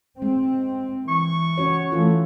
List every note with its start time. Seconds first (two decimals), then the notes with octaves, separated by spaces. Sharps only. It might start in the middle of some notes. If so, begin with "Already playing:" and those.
0.22 G#3 C4
1.08 E3 C#6
1.58 C#4 F#4 C#5
1.92 E3 A3 F4 A4